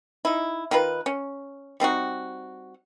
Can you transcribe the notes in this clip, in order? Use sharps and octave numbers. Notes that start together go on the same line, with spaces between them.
D#4 E4
D#3 D#4 F4 B4
C#4
G3 C4 D#4 F#4